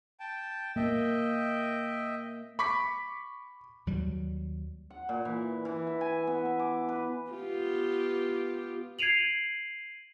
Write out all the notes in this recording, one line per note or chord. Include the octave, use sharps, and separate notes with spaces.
G5 A5
A#3 D#5 E5 G5
B5 C#6 D6 B6
D#2 F#3 G3
F#5
A#2
E3
E3
E5
G#5
B3
E5
D6
B4
B3 F4 G4
G#6 C7 D7 D#7 F7 F#7